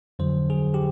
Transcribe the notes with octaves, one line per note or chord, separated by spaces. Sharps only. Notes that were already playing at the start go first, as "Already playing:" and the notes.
F2 D3 F#3 C5
G#4
G4